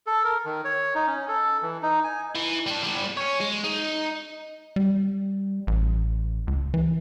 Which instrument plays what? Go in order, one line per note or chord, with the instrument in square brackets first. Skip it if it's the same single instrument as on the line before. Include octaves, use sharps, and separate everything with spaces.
[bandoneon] A4
A#4
D#3
C#5
D#4
C#4
A4
E3
D#4
G#5
[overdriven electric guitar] E3
G3 D4
G3 B3
C#4 C#5
G#3
D#4
[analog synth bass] G3
A1
C#2
E3